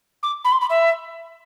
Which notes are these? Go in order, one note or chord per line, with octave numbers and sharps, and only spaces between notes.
D6
B5
C6
B5
E5